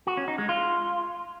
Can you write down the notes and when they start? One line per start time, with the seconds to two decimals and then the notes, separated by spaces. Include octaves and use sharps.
0.07 F#4
0.17 C#4
0.28 D#4
0.38 G#3
0.49 F4